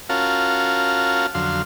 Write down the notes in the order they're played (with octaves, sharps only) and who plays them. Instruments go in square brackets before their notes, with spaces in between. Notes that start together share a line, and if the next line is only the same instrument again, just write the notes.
[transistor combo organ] C#4 F4 F#4 A#4 F5 A5
F2 D3 F#3 F5 C6